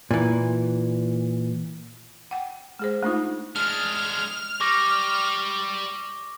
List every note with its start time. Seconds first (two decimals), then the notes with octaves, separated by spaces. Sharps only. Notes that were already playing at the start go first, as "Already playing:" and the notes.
0.11 A#2 E3
2.31 F#5 G5
2.79 G#3 G#4 C5
3.03 A3 D4 D#4 F4
3.56 G#3 D4 F6
4.61 G3 C#6 D6 A#6